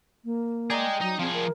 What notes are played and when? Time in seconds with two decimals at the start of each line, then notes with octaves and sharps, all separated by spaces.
0.25 A#3
0.70 G#4 D5 D#5 G5 A#5
1.01 F#3 D#4
1.19 F3 C4 G#4
1.34 A#4